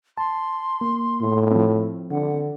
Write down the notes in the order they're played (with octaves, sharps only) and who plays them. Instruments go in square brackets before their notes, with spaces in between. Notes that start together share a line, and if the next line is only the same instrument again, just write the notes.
[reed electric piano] A5 [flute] C6
[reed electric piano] A#3
[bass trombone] A2
[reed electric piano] F3 C4
[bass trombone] D3 [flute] F#5